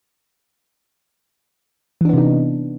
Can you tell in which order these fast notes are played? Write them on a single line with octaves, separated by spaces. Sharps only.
E3 D4 B3 C3 D#4